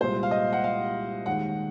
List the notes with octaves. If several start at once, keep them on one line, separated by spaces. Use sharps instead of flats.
C2 A#2 G#3 C5
F5
D#5
F#5
F5
D#2 D#3 G#3 F#5